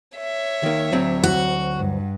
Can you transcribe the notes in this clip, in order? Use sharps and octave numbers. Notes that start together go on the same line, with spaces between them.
C#5 E5
D#3 A#3
D2 F#3 C4
F#4
G2